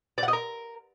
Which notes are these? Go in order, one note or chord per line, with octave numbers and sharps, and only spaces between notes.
D5
F#5
D#5
A#4